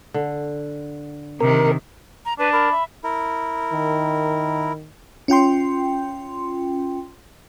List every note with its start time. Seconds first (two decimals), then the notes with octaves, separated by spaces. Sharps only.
0.14 D3
1.41 C3 D#3 A#4
2.25 A#5
2.39 D4 B4
2.53 A#4 B5
2.72 E5
3.04 E4 A#4
3.73 D#3
5.28 C#4 F4 G5 C6